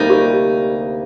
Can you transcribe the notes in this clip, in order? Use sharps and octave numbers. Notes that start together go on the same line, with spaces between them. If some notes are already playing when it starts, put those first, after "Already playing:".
Already playing: D2 C3 G3 A#3 D#4
G4